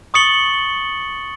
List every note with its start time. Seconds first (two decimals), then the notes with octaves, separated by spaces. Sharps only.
0.14 C#6 D#6 A6 C#7 F#7 G7